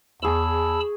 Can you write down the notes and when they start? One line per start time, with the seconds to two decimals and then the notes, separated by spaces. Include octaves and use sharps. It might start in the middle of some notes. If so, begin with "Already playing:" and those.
0.22 E2 G#4 A5 B5 C#6 E6